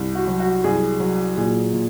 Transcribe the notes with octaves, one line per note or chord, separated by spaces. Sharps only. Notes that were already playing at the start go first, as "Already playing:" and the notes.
Already playing: C2
F#4
F#3
F#4
C2 G#4
F#3
A#2 G#4
A#2